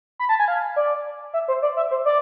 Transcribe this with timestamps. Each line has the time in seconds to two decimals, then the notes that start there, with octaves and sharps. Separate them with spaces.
0.19 B5
0.29 A5
0.39 G#5
0.48 F5
0.76 D5
1.34 E5
1.48 C5
1.62 D5
1.77 E5
1.91 C5
2.05 D5